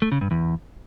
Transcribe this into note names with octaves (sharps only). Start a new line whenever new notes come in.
A3
C#3
G2
E2